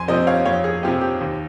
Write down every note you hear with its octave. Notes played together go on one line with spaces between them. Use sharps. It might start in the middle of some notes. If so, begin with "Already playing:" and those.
Already playing: F2 G#5 C6
C3 F3 C4 C5 D#5
C#5 F5
F2 C#5 F5
G#4
C3 F3 C4 G4
G4
D#2